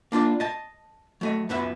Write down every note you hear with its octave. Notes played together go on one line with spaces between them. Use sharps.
A#3 D4 F4 D5
D#5 A5
F#3 A3 D#5
C#2 F#2 B3 B4 E5